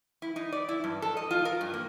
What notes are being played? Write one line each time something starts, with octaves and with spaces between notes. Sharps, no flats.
E4
D#4
D5
E4
G2
A4
D#5
F4
A#4
G2
A#3